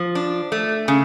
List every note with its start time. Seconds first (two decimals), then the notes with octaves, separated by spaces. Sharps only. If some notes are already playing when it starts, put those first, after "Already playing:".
Already playing: F3
0.15 D4
0.52 A3
0.88 C#3